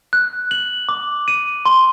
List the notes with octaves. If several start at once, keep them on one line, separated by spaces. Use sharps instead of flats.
F#6
F#7
D6
D#7
C6